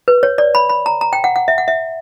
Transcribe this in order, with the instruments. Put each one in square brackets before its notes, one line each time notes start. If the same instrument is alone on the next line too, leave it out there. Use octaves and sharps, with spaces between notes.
[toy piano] B4
C#5
D5
B5
B5
A#5
A#5
G5
F#5
F#5
E5
F#5
E5